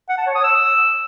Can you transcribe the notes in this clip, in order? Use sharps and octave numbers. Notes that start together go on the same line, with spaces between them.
F#5
A5
C#5
D#6
E6